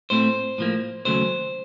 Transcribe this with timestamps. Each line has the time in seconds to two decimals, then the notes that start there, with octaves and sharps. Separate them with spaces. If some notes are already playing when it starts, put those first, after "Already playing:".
0.10 A2 A3 C4 C5
0.58 A2 F3 A#3
1.05 D#2 C#3 F#3 A3 C5